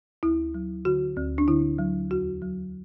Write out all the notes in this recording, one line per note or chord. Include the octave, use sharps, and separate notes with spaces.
D2 E4
F#3
D3 F#4
D2
D4
D3 E4
F#3
E2 F#4
F#3